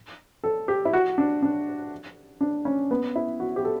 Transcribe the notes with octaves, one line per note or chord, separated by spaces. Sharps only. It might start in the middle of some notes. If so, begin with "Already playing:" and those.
A4
G4
E4
F#4
D4
D4
D4
C#4
B3
E4
F#4
G4
A4